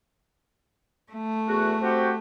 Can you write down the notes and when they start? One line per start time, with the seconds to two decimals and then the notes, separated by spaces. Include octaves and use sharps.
1.12 A3
1.48 E2 F#4
1.82 C4 F#4 G4